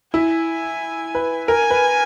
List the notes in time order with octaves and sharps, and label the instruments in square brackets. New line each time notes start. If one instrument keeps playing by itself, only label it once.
[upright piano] E4 [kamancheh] G#5
[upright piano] B4
[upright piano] A#4 [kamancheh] G#5
[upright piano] B4